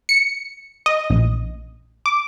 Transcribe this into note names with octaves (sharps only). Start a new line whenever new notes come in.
C#7
D#5
A#1
D6